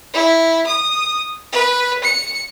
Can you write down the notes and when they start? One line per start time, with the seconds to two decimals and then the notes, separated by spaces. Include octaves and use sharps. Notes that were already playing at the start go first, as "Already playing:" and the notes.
0.13 E4
0.67 D#6
1.52 B4
2.03 C#7